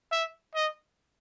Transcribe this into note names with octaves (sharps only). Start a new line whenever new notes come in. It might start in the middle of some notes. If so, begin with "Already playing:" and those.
E5
D#5